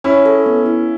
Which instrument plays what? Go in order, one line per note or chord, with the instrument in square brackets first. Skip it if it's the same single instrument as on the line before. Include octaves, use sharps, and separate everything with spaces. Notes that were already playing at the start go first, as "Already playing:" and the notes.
[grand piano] C#4 E4 [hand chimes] C#5
[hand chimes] A4
B3
E4